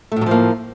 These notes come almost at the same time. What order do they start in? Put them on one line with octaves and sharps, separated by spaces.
A3 A2 F#3 F3 A#3